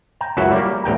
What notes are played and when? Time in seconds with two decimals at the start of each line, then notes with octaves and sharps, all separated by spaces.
0.21 G5 A#5
0.37 C#2 F#2 E4 F#4 E5
0.52 G3 A#3
0.84 A1 E2 G5 A#5